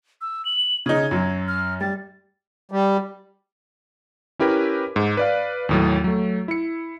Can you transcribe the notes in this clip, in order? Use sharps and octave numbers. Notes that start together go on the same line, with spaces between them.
E6
F#7
C#3 D#4 G#6
F#2 F#3
F6
G3 A6
G3
C#4 E4 G4 A#4 B4
G#2
B4 D5 F5
D#2 A2 F#3
F#3 A3
E4 C#7